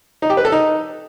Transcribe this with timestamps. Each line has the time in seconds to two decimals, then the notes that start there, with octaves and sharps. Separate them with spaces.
0.22 D#4
0.30 G4
0.37 B4
0.45 A4
0.52 D#4